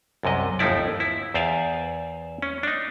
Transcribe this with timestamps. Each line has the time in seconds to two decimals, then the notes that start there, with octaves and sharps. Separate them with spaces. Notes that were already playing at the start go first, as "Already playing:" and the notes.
0.23 C2 F#2 C3 D#5
0.59 G1 D#2 F3 D#4 E4 D5
1.00 E4
1.34 E2 C5 D5 F5 G#5
2.42 C#4
2.63 D4 D#4